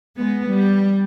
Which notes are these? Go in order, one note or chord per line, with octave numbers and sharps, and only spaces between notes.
G#3 B3
G3